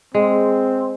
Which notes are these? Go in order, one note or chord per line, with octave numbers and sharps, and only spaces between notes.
G#3 C4